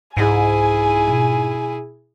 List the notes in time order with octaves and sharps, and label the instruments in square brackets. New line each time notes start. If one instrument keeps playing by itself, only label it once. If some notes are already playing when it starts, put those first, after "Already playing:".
[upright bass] C2 [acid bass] G#2 [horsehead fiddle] E4 G#4 [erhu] G#5
[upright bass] B2 F4